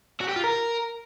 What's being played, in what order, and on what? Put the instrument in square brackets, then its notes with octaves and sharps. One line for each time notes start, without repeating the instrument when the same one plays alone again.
[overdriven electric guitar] F#4
G4
F4
A#4